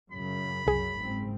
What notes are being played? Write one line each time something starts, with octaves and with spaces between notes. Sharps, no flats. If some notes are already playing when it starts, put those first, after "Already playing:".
F#2 C#3 B5
C2 F#2 G#4
F#1 G#2 C4